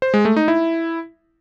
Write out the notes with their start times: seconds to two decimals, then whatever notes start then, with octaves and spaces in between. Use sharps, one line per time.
0.02 C5
0.14 G#3
0.25 A3
0.36 D#4
0.48 E4